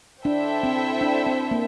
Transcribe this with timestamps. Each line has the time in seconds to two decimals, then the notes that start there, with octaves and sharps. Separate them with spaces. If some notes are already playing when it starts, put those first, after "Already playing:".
0.25 D4 E4 A4 C5 E5 G5
0.63 C4
1.01 D4
1.27 C4
1.51 A#3